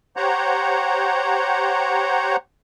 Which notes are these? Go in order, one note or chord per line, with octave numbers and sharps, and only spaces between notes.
G4 C5 C#5 F#5 A#5